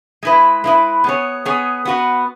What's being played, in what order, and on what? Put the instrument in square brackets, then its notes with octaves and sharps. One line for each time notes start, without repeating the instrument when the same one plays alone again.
[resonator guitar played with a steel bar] G#3 E4 B4
G#3 E4 B4
B3 G#4 C#5
B3 G#4 C#5
B3 F#4 B4